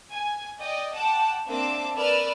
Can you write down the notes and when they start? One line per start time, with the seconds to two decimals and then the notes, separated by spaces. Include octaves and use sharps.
0.12 G#5
0.59 D5 D#5 G5
0.93 F#5 G5 A5 D6
1.46 A#3 C4 D4 E5 A5 D6
1.97 A#4 B4 D5 B5 E6 F6